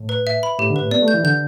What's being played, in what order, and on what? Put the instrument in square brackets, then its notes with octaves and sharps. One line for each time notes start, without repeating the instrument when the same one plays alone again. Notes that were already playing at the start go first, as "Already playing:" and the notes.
Already playing: [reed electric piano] A2
[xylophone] B4
E5
B5
[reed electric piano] A2 [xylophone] G4
[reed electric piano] D3
[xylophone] B4
[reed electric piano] A2
[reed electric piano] B3 [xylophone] D5
[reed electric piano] A3
[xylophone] G6
[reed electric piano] E3
[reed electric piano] D3 [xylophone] G6